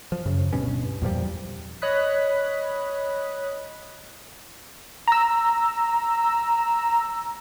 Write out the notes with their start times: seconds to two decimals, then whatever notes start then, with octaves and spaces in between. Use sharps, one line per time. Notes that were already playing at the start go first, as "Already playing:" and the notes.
0.12 F3
0.26 F#2 C#3
0.53 D1 G2 B2 C#4
1.02 E2 A#2 F3 G3
1.82 C#5 D#5 B5 D#6 F#6 B6
5.08 A#5 E6